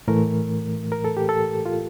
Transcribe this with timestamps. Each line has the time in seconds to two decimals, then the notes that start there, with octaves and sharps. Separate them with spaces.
0.08 A2 E3 A3 A#4
0.92 A#4
1.05 A4
1.17 G4
1.29 A4
1.66 F4